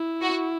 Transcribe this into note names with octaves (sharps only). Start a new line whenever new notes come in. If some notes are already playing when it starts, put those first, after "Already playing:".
Already playing: E4
F#4